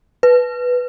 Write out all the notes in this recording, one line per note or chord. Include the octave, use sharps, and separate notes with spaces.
B4